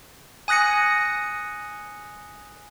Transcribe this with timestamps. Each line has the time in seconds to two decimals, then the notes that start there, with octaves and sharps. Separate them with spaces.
0.48 G#5 D#6 F#6 A#6 C#7